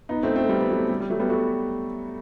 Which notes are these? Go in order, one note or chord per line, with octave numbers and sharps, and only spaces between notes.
B3 D#4
A3 C4
A3 C4
G3 B3
B3
F#3 A3
G3
G3
F#3 A3
G3 B3
F#4 A4